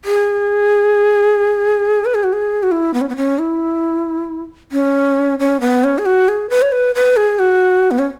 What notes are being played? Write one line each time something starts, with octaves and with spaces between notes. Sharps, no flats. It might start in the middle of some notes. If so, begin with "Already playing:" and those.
G#4
B4
G#4
F#4
G#4
F#4
E4
B3
C#4
B3
C#4
E4
C#4
C#4
B3
C#4
G#4
F#4
G#4
B4
C#5
B4
B4
G#4
F#4
B3
C#4